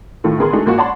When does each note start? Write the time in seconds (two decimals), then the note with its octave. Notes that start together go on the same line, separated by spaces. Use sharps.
0.24 A2 D#3 A3 F4
0.39 D3 B3 G#4 A#4 C6
0.53 G#3 A3 D4 D#4 F#4 G#4
0.66 G#2 G#3 A#3 F4 F#4
0.77 C#5 D5 F#5 A5 B5 C6